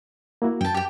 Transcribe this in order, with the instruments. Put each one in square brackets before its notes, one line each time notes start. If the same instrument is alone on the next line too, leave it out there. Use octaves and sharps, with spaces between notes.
[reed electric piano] A#3 E4 F#4
[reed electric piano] F#2 [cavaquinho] G5 A5
[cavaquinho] G4 G5